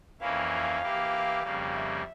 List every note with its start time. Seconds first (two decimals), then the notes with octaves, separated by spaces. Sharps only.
0.21 F2 E3 A#3 C#4 E4 F5
0.51 F5
0.82 E3 A#3 E4 G4
1.43 F2 C#3 G3 A#3
1.73 E5